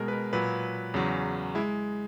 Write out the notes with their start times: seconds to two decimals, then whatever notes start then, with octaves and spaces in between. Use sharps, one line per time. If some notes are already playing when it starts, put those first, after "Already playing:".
Already playing: B2 G#3 A#4
0.08 B4
0.13 A#4
0.33 A#2 F#3 B4
0.94 E2 C#3 F#3
1.55 G#3 E4